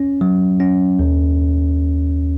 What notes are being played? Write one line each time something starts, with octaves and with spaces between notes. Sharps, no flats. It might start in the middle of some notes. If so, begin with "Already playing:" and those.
Already playing: C#4
F#3
C#4
D#2